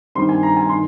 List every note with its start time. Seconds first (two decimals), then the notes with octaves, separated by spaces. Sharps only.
0.15 G2 D#3 G3 C4 C6
0.29 G#5
0.43 A#5
0.57 G#5
0.69 D#3 C6